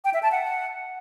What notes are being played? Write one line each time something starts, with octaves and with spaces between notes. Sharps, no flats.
G5
E5
A5
F#5